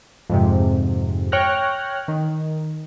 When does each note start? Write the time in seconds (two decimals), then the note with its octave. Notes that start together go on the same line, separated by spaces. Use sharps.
0.30 F2 G#2 C3
1.32 C#5 G5 F6 F#6 A#6
2.08 D#3